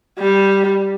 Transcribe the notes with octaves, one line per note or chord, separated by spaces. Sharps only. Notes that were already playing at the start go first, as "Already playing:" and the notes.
G3